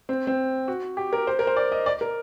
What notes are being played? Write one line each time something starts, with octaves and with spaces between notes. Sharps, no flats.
C4
C4
F#4
G4
A#4
C5
A#4
C5
D5
D#5
D5
A#4